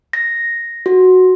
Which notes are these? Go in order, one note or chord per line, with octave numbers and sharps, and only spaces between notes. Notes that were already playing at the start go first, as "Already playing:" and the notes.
A#6
F#4